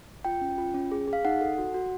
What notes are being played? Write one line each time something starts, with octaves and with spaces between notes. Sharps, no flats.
F4 G5
C#4
F4
C#4
G#4
G#4
F5
D#4 F#5
A4
F#4
F#4